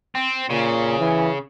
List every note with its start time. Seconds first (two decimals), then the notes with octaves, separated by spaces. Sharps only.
0.15 C4
0.50 A#2 C#3
1.00 E3